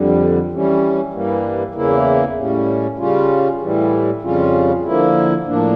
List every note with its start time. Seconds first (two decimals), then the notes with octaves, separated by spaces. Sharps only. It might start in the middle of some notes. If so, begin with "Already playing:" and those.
Already playing: F2 D3 G3
0.51 E3 G3 C#4
1.13 G2 E3 G3 A#3
1.75 E2 C#3 E3 A#3 E4
2.37 A2 G3 C#4
2.99 C#3 G3 C#4 F4
3.61 A2 E3 G3
4.22 F2 C#3 G3 C#4 F4
4.85 D3 F3 A#3 E4
5.46 A2 F3 A#3 D4